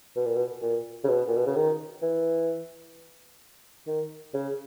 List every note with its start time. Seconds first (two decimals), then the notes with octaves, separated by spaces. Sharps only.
0.16 B2
0.26 A#2
0.36 B2
0.62 A#2
1.04 C#3
1.09 B2
1.28 A#2
1.37 B2
1.46 C#3
1.55 D#3
2.02 E3
3.87 D#3
4.34 C#3